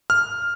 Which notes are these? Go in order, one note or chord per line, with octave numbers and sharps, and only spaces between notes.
F6